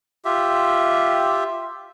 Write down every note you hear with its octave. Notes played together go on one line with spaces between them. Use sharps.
F4 G4 E5